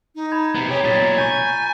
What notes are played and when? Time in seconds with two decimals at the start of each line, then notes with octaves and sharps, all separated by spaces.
0.15 D#4
0.32 A#5 B5 G#6
0.55 C3 B3
0.69 G4 G#4 C#5
0.84 B1 A#2 A#5 A6 B6
1.18 G#5 C#6 G6